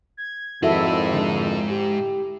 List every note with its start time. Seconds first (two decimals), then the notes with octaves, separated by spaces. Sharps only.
0.17 G#6
0.62 G#1 F2 G#2 E4 F#4 A4 D#5 E5
1.11 D3
1.69 G4